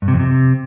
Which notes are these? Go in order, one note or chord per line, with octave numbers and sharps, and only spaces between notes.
G2
C3
F2
C3